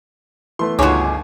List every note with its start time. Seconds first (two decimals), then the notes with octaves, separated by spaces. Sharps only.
0.59 E3 A3 B3 C6
0.79 G1 C#2 D#4 F4 F#4 G#4 C#5 D6